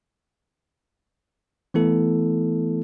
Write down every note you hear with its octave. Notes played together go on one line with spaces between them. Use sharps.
E3 A3 B3 E4 A4